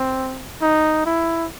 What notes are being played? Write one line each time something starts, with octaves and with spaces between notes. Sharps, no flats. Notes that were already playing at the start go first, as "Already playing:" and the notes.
Already playing: C4
D#4
E4